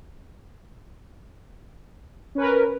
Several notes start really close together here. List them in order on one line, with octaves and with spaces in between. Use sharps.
C#4 B4 A#4